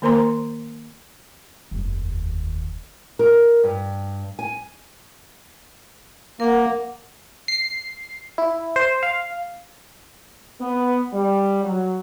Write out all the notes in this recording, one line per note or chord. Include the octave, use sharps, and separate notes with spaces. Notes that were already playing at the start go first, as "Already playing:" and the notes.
D#3 A#3 A#4 C5 A#5 C6
F1 D#2
A#4
G2
G#5
A#3 A#4 F#5
C7
E4
C5
F5
B3
G3
F#3